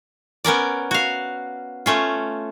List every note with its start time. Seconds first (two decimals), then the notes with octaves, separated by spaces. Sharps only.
0.44 B3 C#4 A#4 D5
0.91 F#4 F5
1.86 A3 C#4 F4